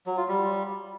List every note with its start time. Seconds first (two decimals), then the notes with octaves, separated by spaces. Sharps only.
0.06 F#3
0.17 F4
0.28 G3